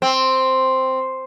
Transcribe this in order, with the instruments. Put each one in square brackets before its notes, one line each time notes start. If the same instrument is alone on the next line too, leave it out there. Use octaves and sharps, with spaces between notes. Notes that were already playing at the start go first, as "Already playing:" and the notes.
[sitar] C4